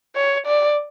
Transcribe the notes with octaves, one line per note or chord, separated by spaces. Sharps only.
C#5
D5